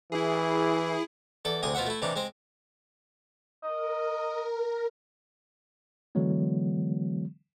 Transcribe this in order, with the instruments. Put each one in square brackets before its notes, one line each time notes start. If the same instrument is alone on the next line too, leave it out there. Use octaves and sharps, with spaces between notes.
[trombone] E3 [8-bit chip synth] E4 G#4
[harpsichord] E2 A4 D5
D2 C3 G#4 D#6
B2 F4 C5 E5 F#5
A3 E4
C3 E3 D4 D#4
G#3 C4 C5
[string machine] A#4 [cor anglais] D#5
[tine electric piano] D3 E3 F#3 G#3 B3